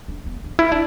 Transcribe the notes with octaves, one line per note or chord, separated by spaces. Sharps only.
D4
B3
D4
E4
D4